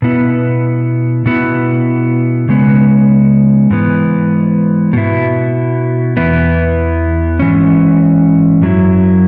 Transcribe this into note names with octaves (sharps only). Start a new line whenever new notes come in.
B2 B3 E4
B2 B3 E4
C#3 G#3 B3
G#2 E3 B3
B2 B3 E4
E2 E3 B3 E4
G#2 E3 C#4
F#2 F#3 E4